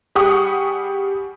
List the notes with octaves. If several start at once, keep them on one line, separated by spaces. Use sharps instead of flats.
G3 G4 G#4 F#5 C#6 D#6